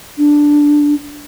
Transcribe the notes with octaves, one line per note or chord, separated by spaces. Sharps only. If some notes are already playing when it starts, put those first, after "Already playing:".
D4